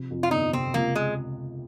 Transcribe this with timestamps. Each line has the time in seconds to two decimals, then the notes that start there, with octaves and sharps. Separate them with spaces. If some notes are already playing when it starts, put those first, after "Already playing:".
Already playing: C3 F3
0.11 F2
0.23 F4
0.31 G1 D#4
0.53 C3 C4
0.74 C#2 A#3
0.96 G#3